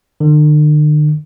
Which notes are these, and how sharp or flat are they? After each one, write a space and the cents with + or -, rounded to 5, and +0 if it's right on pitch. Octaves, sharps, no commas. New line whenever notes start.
D3 +45